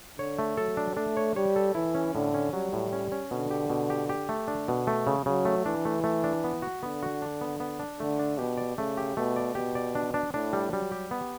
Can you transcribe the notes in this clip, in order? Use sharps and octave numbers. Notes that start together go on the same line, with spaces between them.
D3 C#5
A3
F#3 A4
D4
A3 D4
C#5
G3 C#5
A4
E3 E4
C#4
A2 D3
C#4
F#3 G3
A2
C#4
C#4
B2 D3
G4
B2
G4
G4
A3
D3 D4
B2
A3
C#3
C#3 F#3
A3
E3 D4
A3
A3
D4
B3
F#4
D3 B3
F#4
D4
B3
B3
D4
D3 A3
D4
B2 G4
D5
C#3 A3
G4
B2 A3
D5
B2 G4
D5
D4
D4
A2 D4
G3
F#3 G3
G4
B3